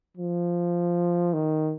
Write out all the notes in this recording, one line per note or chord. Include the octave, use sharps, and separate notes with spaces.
F3
D#3